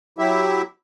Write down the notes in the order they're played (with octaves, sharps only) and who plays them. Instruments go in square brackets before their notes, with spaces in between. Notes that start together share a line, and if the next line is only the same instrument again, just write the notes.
[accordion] F#3 E4 G4 E5